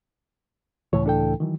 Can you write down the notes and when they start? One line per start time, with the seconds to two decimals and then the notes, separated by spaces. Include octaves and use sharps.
0.93 C#2 A2 E3 C#5
1.06 D4 A4 G5
1.40 D#3 E3 F#3